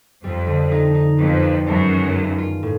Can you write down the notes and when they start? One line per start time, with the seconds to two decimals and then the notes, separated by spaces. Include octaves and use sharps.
0.24 F2 G3
0.47 D3
0.72 D#4
0.94 D#4
1.18 F2 B3
1.43 D4
1.66 F#2 G#3
1.90 D#3
2.14 F4
2.38 F4
2.63 A2